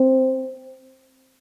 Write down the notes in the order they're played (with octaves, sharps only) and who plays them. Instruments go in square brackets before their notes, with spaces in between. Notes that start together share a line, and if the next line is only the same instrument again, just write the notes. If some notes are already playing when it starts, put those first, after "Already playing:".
Already playing: [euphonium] C4